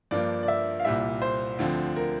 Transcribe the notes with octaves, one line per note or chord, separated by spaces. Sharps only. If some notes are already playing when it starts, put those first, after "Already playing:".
G2 F3 A#3 D4 D5
D5
E5
F5
C2 A#2 G3 E5
C5
D2 D3 F3 C4
A#4